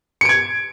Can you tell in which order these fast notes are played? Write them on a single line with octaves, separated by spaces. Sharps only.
C#7 D7 G#6